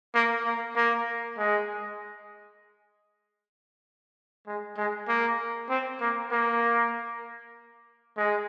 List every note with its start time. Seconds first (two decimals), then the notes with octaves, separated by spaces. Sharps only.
0.15 A#3
0.46 A#3
0.76 A#3
1.38 G#3
4.47 G#3
4.77 G#3
5.08 A#3
5.70 C4
6.00 A#3
6.31 A#3
8.17 G#3